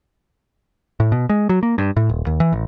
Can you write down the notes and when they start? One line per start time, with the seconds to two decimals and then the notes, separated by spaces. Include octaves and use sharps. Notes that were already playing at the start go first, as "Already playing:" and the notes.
1.00 A2
1.12 B2
1.29 G#3
1.49 F#3
1.63 A#3
1.78 G2
1.97 A2
2.09 D#1
2.26 D#2
2.40 E3
2.53 A1